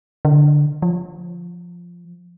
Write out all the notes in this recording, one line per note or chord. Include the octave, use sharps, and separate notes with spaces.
D3
F3